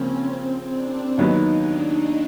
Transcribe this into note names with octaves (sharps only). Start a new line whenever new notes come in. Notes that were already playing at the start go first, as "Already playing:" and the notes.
Already playing: C#3 F3 A#3 C4 C#4
C4
D4
D#2 D#3 F#3 B3 D#4
D4